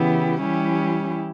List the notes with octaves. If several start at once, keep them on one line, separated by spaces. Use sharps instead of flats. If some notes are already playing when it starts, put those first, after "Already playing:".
Already playing: C#3 E3 B3 E4 G4
E3 G3 C#4 E4 G4